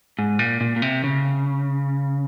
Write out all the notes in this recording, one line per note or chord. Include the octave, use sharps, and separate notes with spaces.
G#2
A#2
A#2
A#2
C3
C#3